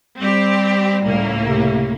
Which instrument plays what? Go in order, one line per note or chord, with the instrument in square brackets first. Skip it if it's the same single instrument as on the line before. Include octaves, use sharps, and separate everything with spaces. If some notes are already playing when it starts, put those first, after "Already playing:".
[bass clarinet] G3 [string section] C4 G4
[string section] C#2 A2 A#3
[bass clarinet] C3